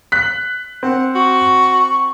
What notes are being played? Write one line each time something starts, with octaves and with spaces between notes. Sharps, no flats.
F#6 B6
C4 F#5
F#4 C#6